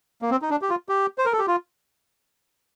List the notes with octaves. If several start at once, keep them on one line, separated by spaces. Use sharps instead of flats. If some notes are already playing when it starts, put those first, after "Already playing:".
A#3
C4
D#4
D4
G4
F4
G4
C5
A#4
A4
G4
F4